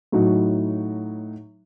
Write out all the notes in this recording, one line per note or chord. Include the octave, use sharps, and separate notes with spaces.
A2 F#3 D#4 F#4